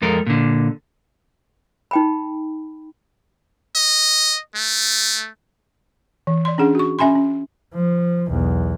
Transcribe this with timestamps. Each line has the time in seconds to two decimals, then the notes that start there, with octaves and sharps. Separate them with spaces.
0.02 F2 G#3 A4 A#4
0.26 A#2 D3
1.91 D#4 G5 B5
3.75 D#5
4.55 A3
6.27 E3
6.45 D5 C6
6.58 C#4 D4 G#4 F#5
6.75 F#4 C#6
6.99 C#4 E5 G#5 B5 C6
7.15 C#4
7.74 F3
8.28 B1 E2